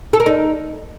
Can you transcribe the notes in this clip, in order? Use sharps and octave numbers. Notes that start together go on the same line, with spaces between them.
A4
A#4
D#4